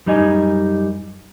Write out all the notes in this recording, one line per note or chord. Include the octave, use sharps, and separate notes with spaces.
F#2 G3 D#4 D#5 G#5